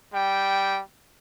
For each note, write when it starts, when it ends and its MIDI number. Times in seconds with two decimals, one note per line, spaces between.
0.13 0.81 55
0.13 0.81 79